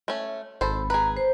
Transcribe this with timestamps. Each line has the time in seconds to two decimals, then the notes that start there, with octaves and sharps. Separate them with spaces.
0.08 A3 C#4
0.61 G#1 A4 C5 B5
0.90 G#4 B4 A#5
1.17 C5